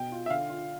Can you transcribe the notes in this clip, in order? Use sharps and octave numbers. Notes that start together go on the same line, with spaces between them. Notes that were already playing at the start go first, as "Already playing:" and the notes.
Already playing: B2 G5
F4
E5
D3 F5
F4